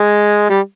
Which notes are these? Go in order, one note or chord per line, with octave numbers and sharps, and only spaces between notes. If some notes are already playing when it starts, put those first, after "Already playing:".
Already playing: G#3
G3